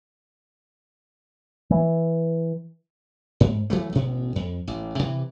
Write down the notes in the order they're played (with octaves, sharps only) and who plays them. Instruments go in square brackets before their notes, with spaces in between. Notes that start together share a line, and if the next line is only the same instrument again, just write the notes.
[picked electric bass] E3
[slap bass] G#2
E3 F#3 A3
A1 B2
F2
A1
C3 E3